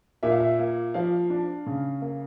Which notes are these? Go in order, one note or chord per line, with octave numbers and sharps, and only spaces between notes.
A#2 E5
F5
E5
A#3
F3 F5
D4
C#3
A#3